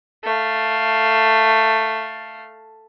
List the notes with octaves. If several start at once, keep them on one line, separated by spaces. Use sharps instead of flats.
A3 F5